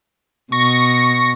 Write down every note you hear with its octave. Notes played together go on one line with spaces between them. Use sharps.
B2 C#6 A#6